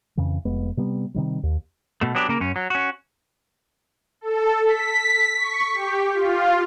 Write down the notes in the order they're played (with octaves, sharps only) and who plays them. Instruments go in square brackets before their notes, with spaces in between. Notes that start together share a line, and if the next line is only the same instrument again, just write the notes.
[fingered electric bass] F2 C#3 E3
F1 G#3 B3
C3 G3 B3
C3 D#3 G3
D#2
[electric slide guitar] B2 A3
F#3 B3 D4 G4
C#3 A#3 A#4
F#2 C#4
F#3
C#4 F#4
[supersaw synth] A4
B6
C#6
G4
F4